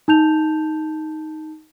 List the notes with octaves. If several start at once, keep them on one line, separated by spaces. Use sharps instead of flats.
D#4 A5 G6 F7